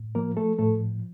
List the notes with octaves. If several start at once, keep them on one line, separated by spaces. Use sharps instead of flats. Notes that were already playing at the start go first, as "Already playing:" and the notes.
Already playing: A2
F3 A#3 A#4
A3 A4
A2 A3 A4